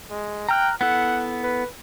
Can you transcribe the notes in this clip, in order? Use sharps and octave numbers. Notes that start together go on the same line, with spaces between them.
G#3
G5 A#5 F6 F#6
B3 E4 A4 F#5
B4